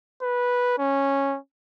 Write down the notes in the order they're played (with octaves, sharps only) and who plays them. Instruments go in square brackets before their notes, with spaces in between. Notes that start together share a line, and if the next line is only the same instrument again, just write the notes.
[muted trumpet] B4
C#4